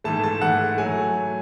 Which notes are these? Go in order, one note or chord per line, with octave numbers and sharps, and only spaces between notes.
G#2 E3 A3 A5
A5
G#2 E3 A3 F#5
F#3 A3 G#5